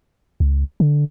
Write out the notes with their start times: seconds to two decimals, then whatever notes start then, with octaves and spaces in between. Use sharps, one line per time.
0.40 C#2
0.80 D3